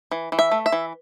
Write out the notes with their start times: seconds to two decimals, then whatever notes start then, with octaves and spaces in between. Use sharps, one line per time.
0.11 E3
0.32 E3
0.39 E5
0.51 A3
0.66 E5
0.72 E3